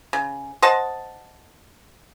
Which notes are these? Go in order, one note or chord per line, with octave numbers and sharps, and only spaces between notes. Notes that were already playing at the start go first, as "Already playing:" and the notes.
C#3
C5 D#5 F#5 A5